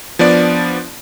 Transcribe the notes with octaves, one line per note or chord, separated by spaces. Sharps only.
F3 B3 D4 D5